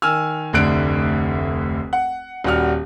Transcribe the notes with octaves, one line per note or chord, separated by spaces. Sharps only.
D#3 G#5 E6 F6
F1 D2 D3 F#6 D7
F#5
D#1 G3 F#4 F#5 F6